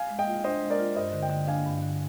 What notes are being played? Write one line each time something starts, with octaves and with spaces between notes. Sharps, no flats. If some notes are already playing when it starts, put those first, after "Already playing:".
Already playing: F5 G#5
G#3
D#5 G5
F4
D4 C5 D#5
G#3
A#4 D5
F4
G2 C5 D#5
D3
D#5 G5
D3
D4 F5 G#5
G2
D3